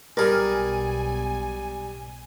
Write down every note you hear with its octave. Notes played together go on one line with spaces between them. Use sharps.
B1 G3 G#4 A#4 G#5